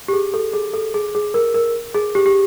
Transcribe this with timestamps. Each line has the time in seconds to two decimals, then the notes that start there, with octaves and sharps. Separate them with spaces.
0.08 G4
0.13 G#4
0.34 A4
0.53 G#4
0.74 A4
0.94 G#4
1.15 G#4
1.34 A#4
1.54 A#4
1.94 G#4
2.15 G4
2.26 G4